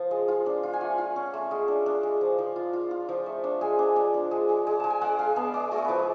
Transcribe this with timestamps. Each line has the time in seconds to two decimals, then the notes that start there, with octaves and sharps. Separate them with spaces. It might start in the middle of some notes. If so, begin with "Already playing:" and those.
Already playing: F3 F4
0.11 G#3
0.28 F4
0.46 D4
0.63 F4
0.73 G#5
0.81 A3 F#5
0.98 F4
1.16 C#4
1.34 A3
1.51 G#3
1.68 D4
1.86 D4
2.03 G#3
2.21 F3
2.38 F3
2.56 F4
2.73 F4
2.91 F4
3.09 F3
3.26 A3
3.44 D4
3.61 G#3 G#5
3.79 D4
3.96 D4
4.14 D4
4.31 G#3
4.49 G#3
4.67 G#3
4.80 G#3 A5
4.90 G#5
5.01 G#3 F#5
5.19 G#3 F5
5.36 B3 A5
5.54 G#3 D5
5.71 G#3 F#4
5.85 F3 A4 B4